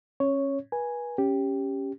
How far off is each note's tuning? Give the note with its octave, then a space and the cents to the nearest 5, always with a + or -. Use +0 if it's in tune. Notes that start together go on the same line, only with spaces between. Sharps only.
C#4 -20 C#5 +0
B4 -30 G#5 +0
C#4 +0 G4 +0